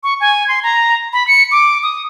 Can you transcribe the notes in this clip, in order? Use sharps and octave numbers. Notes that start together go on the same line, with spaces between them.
C#6
G#5
C6
A#5
B5
C#7
D6
D#6